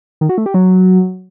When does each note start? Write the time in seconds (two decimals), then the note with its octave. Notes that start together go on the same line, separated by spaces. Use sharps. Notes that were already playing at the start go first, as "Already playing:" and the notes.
0.21 D#3
0.29 F#4
0.38 A3
0.46 G4
0.54 F#3